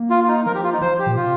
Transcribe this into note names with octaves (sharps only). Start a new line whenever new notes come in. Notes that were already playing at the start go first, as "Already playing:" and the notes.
Already playing: A#3
F4
F4
D#4
F3 A#4
G4
F4
D#4
F3 C5
G4
A#2
C3 F4